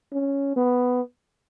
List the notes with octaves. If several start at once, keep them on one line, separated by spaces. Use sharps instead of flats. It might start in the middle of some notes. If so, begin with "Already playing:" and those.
C#4
B3